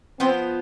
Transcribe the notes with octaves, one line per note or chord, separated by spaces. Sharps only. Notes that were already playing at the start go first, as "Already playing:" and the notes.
F3 B3 C4 F4 C5